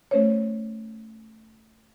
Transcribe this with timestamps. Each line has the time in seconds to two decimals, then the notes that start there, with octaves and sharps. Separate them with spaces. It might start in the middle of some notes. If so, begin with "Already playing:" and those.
0.11 A3 C#4 C5 C#5